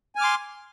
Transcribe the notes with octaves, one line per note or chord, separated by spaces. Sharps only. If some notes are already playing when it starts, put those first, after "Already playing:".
G#5 C6 D6 F6